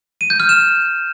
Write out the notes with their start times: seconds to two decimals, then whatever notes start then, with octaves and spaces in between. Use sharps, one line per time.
0.21 D#7
0.30 G6
0.40 F6
0.49 E7